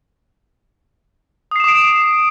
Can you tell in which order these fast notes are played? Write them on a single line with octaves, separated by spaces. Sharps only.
D#6 C7 E7 D6 D7